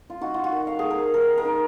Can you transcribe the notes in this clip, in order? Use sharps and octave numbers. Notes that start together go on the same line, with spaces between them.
F4
D#4 F#4
F4
F#4
D#3
F5
A#3 G#4
A#4
D#3 A#4
A#4
D#3